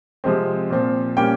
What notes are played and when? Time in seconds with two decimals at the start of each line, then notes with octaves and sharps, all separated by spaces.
0.24 C3 F3 G#3 C4
0.70 A#2 F3 C4
1.16 A#2 G3 A#3 C#4 G5